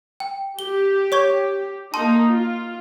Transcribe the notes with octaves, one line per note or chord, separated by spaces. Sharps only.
G5
G4 G7
C#5 C#6 G#6
A#3 D#4 A5 C6
F4